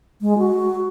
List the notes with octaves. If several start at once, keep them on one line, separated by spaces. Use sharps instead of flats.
G#3
F#4